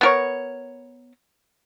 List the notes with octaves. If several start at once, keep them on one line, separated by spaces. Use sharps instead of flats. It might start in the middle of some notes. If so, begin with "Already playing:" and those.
B3 A#4 C#5